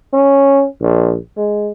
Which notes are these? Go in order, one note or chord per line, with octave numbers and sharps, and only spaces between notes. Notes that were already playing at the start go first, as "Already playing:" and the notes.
C#4
A#1
G#3